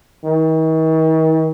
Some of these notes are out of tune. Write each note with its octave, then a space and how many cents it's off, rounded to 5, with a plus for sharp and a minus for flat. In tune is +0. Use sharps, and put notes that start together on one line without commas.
D#3 +45